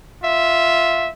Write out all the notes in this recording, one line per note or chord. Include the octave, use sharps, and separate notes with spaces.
F4 E5